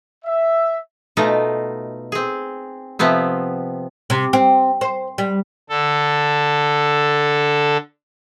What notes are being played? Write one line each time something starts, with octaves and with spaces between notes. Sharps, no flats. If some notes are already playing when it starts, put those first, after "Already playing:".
E5
B2 A3 D#4 F4
C4 G#4
C3 F3 B3 C4
C3
C4
C5
G3
D3 A4